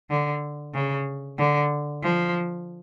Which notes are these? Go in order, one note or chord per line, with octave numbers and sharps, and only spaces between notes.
D3
C#3
D3
F3